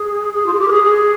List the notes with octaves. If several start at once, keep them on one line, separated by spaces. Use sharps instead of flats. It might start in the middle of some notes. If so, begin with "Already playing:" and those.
Already playing: G#4
G#4
F4
G#4
G4
A#4
G#4
G#4